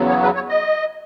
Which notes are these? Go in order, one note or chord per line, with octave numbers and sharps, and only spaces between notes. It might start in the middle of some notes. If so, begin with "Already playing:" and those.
Already playing: E2 C#3 F#3 B3
C#5
B4
C#5
D#5